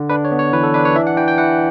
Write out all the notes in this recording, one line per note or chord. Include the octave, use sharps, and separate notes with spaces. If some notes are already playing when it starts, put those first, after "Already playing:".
Already playing: D3
D4 B4
C#5
B3
C#5
E3 B4
A4
D4 B4
C#5
E3 E5
F#5
E3 G5
G5
E3 F#5